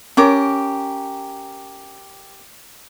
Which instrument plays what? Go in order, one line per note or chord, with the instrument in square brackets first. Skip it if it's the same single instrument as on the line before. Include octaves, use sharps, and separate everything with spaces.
[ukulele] C#4 [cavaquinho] G4 A#4 D6